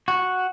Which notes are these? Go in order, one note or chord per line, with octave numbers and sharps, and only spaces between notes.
F#4